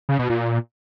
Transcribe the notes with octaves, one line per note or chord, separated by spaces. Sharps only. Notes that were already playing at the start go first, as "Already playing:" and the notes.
C#3
B2
A#2